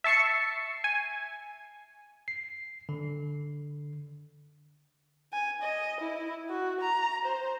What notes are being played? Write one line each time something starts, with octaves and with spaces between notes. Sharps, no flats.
E5 A5 C#6 C7 C#7
G#5
C7
D3
G#5
D#5
E4
F#4
A#5
C5